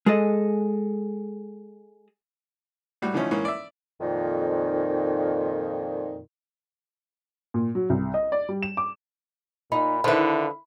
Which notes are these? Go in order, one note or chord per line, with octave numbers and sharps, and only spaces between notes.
G#3 G#4 A4 D#5
A2 G3 F#4
D3 E3 F3 A3 C#4 D#4
G#2 E3 A#3 C#4
D5 E5
F2 A#2 D#3
A#2
F#3
C2
D#5
D5
G3
E7
D6
A#2 D#4 B5
D3 D#3 F3 E4 B4